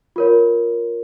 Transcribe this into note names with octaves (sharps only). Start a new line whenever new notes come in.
F4 A#4 C#5